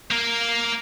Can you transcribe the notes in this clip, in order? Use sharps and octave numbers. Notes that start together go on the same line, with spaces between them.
A#3 A#4